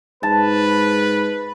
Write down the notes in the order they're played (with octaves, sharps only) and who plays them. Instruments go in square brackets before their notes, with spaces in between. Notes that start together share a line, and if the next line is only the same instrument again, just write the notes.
[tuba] G#2 [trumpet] B4 [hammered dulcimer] A5